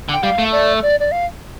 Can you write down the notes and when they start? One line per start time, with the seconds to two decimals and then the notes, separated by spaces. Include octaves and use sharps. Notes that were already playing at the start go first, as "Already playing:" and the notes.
0.09 D3
0.13 G5
0.23 G3 F5
0.38 A3
0.52 D5
0.82 D5
1.00 D5
1.12 F5